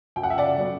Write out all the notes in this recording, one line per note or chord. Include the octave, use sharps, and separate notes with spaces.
F#2 G5
F#5
E5
D5 F#5
F#3 B3